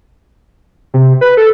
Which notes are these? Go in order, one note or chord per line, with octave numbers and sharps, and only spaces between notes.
C3
B4
A4